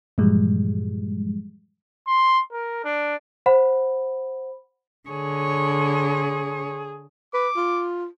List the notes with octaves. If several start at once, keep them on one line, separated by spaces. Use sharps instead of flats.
G2 A#2 E3 F3 G3 G#3
C6
A#4
D4
C5 F#5 B5
D3 G#4 C#5
B4 D6
F4